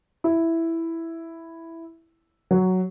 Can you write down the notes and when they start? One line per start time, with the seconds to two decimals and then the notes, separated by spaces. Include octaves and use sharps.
0.24 E4
2.51 F#3